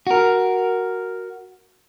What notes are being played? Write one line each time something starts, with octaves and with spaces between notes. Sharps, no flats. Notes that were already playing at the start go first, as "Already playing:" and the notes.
F#4 A#4